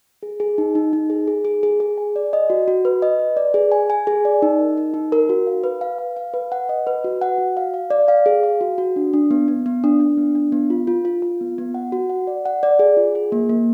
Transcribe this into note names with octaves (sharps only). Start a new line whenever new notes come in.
G#4
G#4
D#4
D#4
D#4
G#4
G#4
G#4
G#4
G#4
G#5
D5
D#5
F#4
F#4
B4
D#5
B4
D5
G#4
G#5
G#5
G#4
D5
D#4
A#4
D#4
D#4
A#4
F#4
F5
B4
F5
F5
F5
B4
F#5
D#5
B4
F#4
F#5
F#4
F5
F5
D5
F5
G#4
F5
F#4
F#4
D4
D4
B3
B3
B3
D4
D4
B3
D4
B3
F4
F4
F4
F4
B3
B3
F#5
F#4
F#5
D5
F#5
D5
G#4
F4
G#4
A#3
A#3